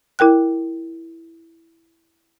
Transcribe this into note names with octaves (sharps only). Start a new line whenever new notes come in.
E4 A#4 G5 F#6